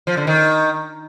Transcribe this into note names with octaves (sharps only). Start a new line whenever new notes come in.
F3
D3
D#3